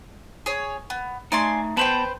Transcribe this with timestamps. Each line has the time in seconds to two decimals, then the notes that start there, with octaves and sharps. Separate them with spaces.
0.46 G#4 C#5
0.90 B3
1.32 A3 D#4 D5 G#5 C6
1.77 B3 B4 C5 G5 A5 B5